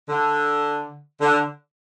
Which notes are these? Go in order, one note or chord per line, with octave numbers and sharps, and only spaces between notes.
D3
D3